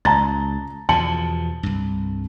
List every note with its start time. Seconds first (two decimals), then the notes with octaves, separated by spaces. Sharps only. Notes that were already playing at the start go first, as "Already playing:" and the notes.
0.05 C#2 A5 A#5 A6
0.89 E2 B2 F3 A5 C#7 F#7
1.63 C2 G2